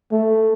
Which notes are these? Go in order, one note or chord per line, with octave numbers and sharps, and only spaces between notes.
A3